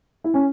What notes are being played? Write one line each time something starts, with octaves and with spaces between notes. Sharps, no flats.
E4
C#4